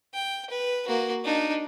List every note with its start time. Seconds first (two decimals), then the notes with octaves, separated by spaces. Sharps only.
0.14 G5
0.50 B4
0.88 A#3 F#4
1.24 D4 D#4